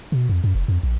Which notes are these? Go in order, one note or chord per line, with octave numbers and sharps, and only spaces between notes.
B2
F2
F#2
F1
F2
A#1